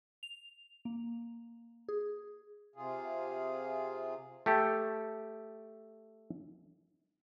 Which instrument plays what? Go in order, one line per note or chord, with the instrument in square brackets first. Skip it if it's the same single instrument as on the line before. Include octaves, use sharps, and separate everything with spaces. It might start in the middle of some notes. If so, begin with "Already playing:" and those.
[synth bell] F7
A#3
G#4
[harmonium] C3 F4 G#4
[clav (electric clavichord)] A3 G4 A4